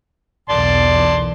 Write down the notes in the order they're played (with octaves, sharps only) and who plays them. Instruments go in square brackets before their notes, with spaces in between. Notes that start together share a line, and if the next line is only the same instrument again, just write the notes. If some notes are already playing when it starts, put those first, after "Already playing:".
[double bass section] B1 E2 [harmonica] D5 A5 C6